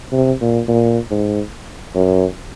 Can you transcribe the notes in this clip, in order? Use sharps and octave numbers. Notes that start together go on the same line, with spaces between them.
C3
A#2
A#2
G#2
F#2